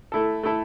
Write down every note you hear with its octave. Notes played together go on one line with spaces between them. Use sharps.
A3 E4 A4
A3 E4 A4